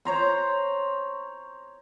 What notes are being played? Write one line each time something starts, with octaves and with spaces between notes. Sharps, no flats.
C5 C#5 A#5 C6